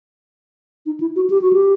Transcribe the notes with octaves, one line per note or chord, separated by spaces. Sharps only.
D#4
E4
F#4
G4
F#4
G4